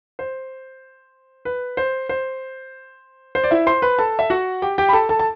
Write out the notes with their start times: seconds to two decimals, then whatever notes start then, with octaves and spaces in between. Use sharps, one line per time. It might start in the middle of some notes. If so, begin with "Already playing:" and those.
0.19 C5
1.45 B4
1.77 C5
2.09 C5
3.35 C5
3.44 D5
3.51 E4 E5
3.67 C5 C6
3.82 B4 B5
3.99 A4 A5
4.19 E5
4.30 F#4 F#5
4.62 G4 G5
4.78 G4 G5
4.89 B5
4.93 A4 A5
5.09 A4 A5
5.19 A5